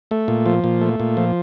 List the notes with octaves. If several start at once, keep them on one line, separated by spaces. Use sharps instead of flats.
A3
A#2
F3
A#2
A3
A#2
F3